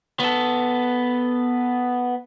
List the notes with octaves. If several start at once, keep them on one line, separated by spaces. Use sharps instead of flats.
B3 A4